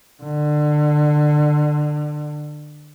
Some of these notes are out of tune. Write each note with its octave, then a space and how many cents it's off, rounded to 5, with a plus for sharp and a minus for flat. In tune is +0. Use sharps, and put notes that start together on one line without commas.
D3 +25